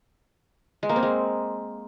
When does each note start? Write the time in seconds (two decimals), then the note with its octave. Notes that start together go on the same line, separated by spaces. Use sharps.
0.83 G#3
0.89 A#3
0.96 C4
1.03 G#3